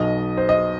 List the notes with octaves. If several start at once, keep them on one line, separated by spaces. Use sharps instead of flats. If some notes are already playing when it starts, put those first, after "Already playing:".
Already playing: B1 B2 D#5
C5
D#5